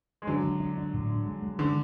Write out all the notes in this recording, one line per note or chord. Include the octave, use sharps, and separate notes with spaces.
G#3
D3 F#3 D4
D4
D4
D4
A2
D4
G#3
G#3
D3 G#3